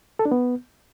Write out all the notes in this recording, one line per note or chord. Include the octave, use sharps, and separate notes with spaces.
A4
D4
B3